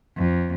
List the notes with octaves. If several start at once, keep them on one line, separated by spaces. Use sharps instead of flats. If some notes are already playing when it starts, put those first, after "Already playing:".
F2